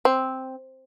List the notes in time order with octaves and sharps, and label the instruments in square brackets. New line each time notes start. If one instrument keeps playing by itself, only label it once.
[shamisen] C4